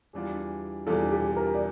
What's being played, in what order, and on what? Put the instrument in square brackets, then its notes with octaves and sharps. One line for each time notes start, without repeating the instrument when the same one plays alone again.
[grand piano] E2 E3 G3 D4 F4
[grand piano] E2 E3 G3 D4 F4 [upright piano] A4
[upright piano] G4
A#4
D5